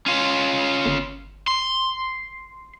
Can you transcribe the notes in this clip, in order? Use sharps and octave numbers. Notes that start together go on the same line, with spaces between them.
C#4 F4
G1
C6